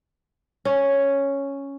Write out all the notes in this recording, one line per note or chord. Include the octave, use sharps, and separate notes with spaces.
C#4